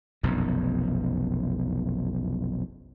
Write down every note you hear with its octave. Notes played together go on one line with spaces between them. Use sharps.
F1 B1 F#2